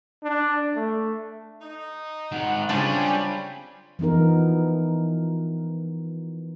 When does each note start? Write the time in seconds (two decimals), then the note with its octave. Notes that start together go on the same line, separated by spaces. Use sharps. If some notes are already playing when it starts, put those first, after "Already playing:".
0.23 D4
0.75 A3
1.62 D#4
2.32 G#2 D#3 F#5
2.69 C#3 G3 C4 D4 F4 C#5 G#5
3.99 E3 F3 B3 D#4 A#4